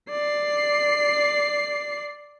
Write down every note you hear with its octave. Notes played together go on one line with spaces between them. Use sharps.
D5 C7